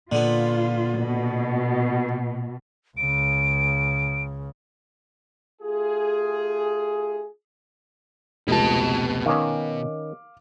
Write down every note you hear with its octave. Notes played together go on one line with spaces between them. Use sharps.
A#2 D3 B3 F4
B2
C#2 C#3 D7
A3 F4 G4 G#4
F1 C#2 B2 A5
D#3 C#4 F5 D6